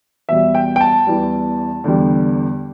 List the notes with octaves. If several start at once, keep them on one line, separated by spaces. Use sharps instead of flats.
E2 B2 G3 E5
G5
G5
A5
E2 E3 G3
E2 D3 G3